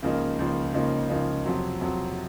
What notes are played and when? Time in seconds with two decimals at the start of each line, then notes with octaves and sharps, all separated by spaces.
0.03 C#2 C#3 F3 A#3 D#4
0.39 C#2 C#3 F3 A#3 D#4
0.74 C#2 C#3 F3 A#3 D#4
1.10 C#2 C#3 F3 A#3 D#4
1.45 F2 C3 F#3
1.81 F2 C3 F#3